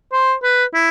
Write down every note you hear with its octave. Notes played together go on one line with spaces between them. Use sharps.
C5
B4
E4